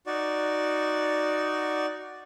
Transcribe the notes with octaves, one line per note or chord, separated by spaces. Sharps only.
D#4 F#4 D5